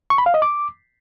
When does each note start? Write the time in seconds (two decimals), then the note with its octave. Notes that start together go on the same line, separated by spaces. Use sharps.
0.10 C#6
0.18 B5
0.26 F5
0.34 D#5
0.42 D6